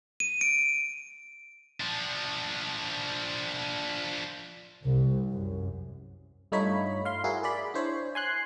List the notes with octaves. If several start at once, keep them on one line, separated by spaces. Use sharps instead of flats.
D#7
D7
F3 D4
C2
F#2
G2 A3 D#4 F4 C#5 B5
F5 C6
E4 F#4 G#4 A#4
G#4 D5 B5
D4 E4 C5 C#5
G#5 C6 F#6